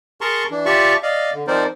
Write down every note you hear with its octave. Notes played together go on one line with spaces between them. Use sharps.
G#4 A#4 A5 A#5 C6 C#6
E3 D4
F4 G4 D5 E5 A5 C#6
D5 D#5 F5
D3
F3 C4 D#4 A#4 C5 D5